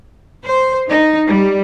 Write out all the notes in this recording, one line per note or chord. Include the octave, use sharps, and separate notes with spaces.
C5
D#4
G3